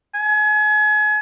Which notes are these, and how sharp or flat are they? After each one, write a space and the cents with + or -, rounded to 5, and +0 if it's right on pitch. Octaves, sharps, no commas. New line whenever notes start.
G#5 +35